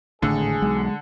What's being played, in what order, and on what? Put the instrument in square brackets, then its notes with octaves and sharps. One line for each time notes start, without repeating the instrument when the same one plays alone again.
[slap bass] G#1 A2 A3 [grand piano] D3 [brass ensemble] G#4
[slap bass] B1 [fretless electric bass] G#3